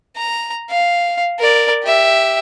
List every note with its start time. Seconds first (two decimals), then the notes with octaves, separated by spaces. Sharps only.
0.16 A#5
0.70 F5
1.39 A#4 D5
1.83 G4 E5